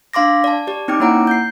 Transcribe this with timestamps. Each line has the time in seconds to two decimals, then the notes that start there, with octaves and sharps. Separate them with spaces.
0.14 D4 F5 C6 D6 A#6
0.44 D5 A5
0.67 G4 D5
0.88 C4 C#4 D#4 G5 D6
1.00 A#3 E4 C#5 F#5 A#5 D7
1.27 G6 C7